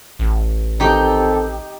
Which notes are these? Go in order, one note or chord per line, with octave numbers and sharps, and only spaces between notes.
A1
D#3 C4 D#4 G4 A4